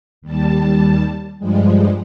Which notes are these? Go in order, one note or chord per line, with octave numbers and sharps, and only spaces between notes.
D#2 G3 A5
G2 F3 G3 G#3